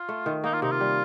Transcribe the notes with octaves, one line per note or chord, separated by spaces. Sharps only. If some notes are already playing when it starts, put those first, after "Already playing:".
Already playing: F4
A3
D#3
A#3 D#4
F4
C3 D#4
F4
G3